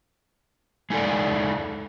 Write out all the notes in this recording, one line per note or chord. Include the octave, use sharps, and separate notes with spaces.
G#3 D#4 E4 A4 D5